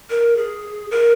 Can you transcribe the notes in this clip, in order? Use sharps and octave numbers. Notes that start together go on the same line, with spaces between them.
A#4
G#4
A#4